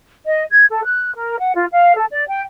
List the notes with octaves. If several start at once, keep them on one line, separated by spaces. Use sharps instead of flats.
D#5
G#6
A4
F#6
A#4
F#5
F4
F5
A4
D5
G5